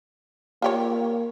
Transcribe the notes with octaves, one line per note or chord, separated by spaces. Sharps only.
A#3 F4 G4 C#5